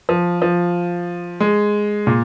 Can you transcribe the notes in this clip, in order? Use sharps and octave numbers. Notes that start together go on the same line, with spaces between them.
F3
F3
G#3
A#2